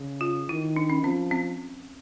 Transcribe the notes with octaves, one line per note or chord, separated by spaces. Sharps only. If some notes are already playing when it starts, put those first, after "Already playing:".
Already playing: C#3
F4
D#3 E4
D4
C#4
F3 C4
C4